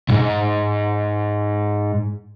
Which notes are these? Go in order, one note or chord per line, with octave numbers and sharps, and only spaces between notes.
B1 G#2